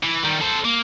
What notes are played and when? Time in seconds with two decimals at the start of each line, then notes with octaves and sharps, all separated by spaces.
0.03 E3
0.24 D#3 G3
0.41 A4 C5
0.65 A#3